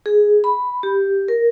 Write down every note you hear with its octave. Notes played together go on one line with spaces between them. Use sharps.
G#4
B5
G4
A#4